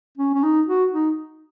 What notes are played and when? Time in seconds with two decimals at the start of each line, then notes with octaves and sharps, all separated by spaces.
0.18 C#4
0.35 C#4
0.43 D#4
0.67 F#4
0.93 D#4